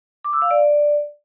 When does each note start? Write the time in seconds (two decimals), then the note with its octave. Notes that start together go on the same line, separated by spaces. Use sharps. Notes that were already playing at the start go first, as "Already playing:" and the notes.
0.24 D6
0.33 E6
0.42 F5
0.51 D5